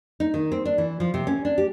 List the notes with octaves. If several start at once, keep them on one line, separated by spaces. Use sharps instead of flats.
D#4
D#3
C4
D4
E3
F3
C3
C#4
D4
G4